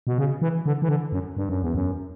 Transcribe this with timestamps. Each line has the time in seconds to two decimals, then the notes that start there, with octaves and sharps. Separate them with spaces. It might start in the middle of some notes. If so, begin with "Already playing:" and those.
0.07 B2
0.18 C#3
0.42 E3
0.66 D3
0.82 E3
0.89 D3
1.12 F#2
1.37 G2
1.49 F#2
1.62 E2
1.75 F#2